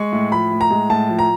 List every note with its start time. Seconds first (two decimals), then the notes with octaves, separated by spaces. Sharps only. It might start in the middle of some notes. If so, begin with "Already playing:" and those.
Already playing: G#3 C#6
0.13 A2
0.32 F3 B5
0.52 A2
0.61 A#5
0.71 G#3
0.90 A2 A5
1.09 F3
1.19 A#5